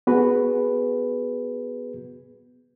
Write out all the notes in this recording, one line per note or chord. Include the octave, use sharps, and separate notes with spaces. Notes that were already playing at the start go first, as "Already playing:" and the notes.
B3 F#4 G#4 B4